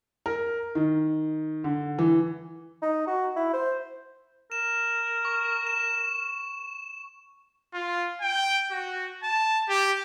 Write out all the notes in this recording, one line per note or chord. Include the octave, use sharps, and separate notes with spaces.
A#4
D#3
D3
E3
D#4
F#4
E4
C5
A#4 E7
C#6
E7
F4
G5
F#4
A5
G4